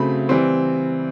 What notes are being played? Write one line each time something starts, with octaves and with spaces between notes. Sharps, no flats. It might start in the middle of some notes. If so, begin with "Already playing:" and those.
Already playing: C#3 F#3 A3 C4 B5
E3 G3 C4